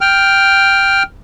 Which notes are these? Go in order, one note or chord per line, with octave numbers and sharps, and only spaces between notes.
G5 F6